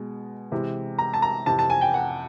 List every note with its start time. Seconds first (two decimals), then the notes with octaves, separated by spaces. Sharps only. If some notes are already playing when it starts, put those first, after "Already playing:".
Already playing: B2 G#3
0.51 C3 E3 G#3
0.98 A#5
1.14 A5
1.22 A#5
1.46 F2 C3 E3 A5
1.59 A5
1.70 G#5
1.81 G5
1.94 F#5